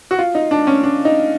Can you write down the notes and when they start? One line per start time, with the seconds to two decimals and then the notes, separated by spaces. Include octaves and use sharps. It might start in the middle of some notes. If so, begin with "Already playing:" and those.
0.11 F#4
0.19 F4
0.35 D#4
0.51 D4
0.67 C#4
0.84 D4
1.05 D#4